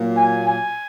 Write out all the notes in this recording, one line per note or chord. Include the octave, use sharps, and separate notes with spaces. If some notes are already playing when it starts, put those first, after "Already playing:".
Already playing: A#2 F#3 A#3
G#5
G#5